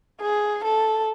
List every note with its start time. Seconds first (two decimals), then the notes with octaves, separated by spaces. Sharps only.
0.21 G#4
0.64 A4